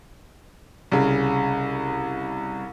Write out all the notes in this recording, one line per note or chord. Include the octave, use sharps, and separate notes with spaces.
C2 C#3